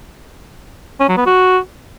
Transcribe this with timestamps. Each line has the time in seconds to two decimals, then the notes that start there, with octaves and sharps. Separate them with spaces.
1.00 C#4
1.09 F#3
1.17 B3
1.26 F#4